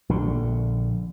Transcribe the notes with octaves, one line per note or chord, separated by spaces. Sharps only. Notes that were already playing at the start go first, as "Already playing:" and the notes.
A#1 D3